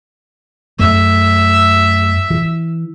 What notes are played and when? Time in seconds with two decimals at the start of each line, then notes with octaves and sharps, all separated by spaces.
0.79 F#2 A3 E5
2.30 E3